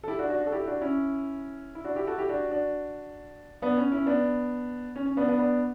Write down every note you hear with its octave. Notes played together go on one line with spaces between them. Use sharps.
A4
E4 G4
D4 F#4
D4 F#4
D4 F#4
A4
E4 G4
D4 F#4
C#4 E4
E4
D4 F#4
E4 G4
F#4 A4
E4 G4
D4 F#4
D4 F#4
B3 D4
C#4
C#4 E4
B3 D4
C#4
C#4
B3 D4
B3 D4
B3 D4